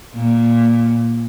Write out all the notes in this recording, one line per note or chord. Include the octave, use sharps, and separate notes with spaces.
A#2